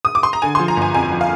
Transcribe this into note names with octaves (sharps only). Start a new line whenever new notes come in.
D#6
D6
C6
A#5
D3 G#5
F3 C6
A#5
G1
G#5
F2 G#5
F3
F5